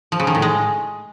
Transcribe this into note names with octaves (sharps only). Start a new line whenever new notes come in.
F3
C#3
D#3
A2
G#3